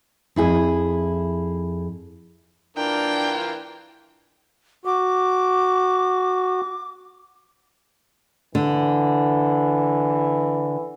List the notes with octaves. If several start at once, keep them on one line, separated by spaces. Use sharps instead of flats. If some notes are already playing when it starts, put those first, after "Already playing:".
F2 E4 G#4
E3 D4 F4 A#4 G5
F#4 D6
D3 E3